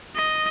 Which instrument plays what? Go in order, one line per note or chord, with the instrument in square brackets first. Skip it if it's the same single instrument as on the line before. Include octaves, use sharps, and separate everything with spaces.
[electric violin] D#5